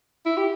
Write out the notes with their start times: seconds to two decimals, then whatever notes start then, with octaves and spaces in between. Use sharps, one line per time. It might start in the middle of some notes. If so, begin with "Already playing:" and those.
0.26 E4
0.37 G4